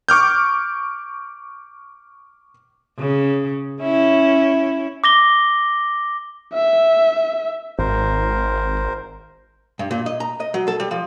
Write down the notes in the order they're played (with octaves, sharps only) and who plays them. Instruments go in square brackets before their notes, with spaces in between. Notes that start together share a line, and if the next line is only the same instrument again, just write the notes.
[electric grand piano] C#6 D6 F6 G6
[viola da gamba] C#3
C#4 E4
[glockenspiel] D6 A#6 G7
[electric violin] E5
[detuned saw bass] G#1 [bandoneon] A#4 C5
[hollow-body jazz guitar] G2
A#2
D#5
A#5
D#5
F#3
A4
G3
F3